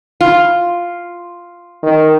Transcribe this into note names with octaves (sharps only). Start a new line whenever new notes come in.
F4
D#3